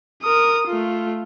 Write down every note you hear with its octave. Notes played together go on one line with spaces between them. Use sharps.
A#4 D#6
A3 F4